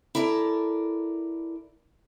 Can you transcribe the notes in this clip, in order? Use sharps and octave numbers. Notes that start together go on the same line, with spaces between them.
E4 A4 A#4 D5